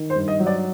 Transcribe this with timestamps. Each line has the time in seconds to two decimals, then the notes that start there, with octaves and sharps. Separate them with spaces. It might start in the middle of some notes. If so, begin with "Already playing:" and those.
Already playing: D#3
0.10 C5
0.15 G2
0.28 D#5
0.39 F#3
0.47 D5